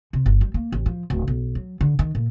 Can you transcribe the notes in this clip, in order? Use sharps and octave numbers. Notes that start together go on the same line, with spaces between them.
C3
G1
G3
A#3
A1
F3
D1
B1
F#3
D3
D#3
A#2